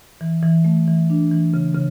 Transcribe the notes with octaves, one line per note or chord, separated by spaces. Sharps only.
E3
E3
A3
E3
D4
E3
C#3
C#3